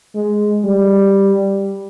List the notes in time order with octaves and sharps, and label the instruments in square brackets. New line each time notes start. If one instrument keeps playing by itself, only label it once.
[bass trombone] G#3
G3